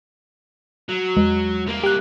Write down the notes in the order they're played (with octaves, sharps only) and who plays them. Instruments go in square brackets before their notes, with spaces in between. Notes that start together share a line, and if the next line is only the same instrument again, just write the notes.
[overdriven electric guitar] F#3
[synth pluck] E2 [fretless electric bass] G#3
[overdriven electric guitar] C2 A#3
[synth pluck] G4 F#6